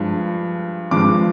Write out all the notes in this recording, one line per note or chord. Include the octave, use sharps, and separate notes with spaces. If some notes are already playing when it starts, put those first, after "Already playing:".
Already playing: G2 F3 G#3
G2 F3 G#3 D6